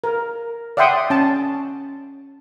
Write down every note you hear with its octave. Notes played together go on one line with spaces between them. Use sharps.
A#4
D5 E5 F#5 G5 C6 D#6
C#4 A5